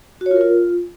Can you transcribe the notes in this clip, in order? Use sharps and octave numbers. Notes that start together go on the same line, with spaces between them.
F#4
C#5
F4
A#4
F4